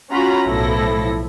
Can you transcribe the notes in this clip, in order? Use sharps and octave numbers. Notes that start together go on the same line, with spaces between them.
C#4 F4 F#4 A#5 B5
B1 A2 F3 E4 A4 A#6